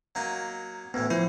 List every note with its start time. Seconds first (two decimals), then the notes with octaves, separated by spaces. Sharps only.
0.15 F#3 A#3 D#4
0.94 D2 A2 E3 B3
1.10 F3 E4 C5